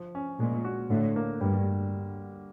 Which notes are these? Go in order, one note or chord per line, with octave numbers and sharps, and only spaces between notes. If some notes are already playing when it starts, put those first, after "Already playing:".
Already playing: F3
C#4
A#2 G#3
F#4
A2 D3
A#3
G2 G3